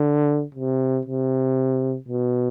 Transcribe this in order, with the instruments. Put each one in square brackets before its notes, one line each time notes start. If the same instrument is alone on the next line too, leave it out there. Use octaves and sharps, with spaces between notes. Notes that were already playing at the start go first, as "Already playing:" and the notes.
Already playing: [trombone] D3
C3
C3
B2